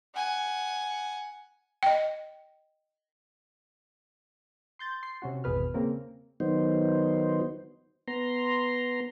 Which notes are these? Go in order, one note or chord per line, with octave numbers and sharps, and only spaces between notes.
F#5 G#5
D#5 G5
C6 G6 A6
C6 C7
C3 C#4 F#4
G#1 E2 B2 G#4 B4 F6
C#3 A#3 C4 A#4
D#3 F#3 B3 D#4 C5
B3 A#5 C6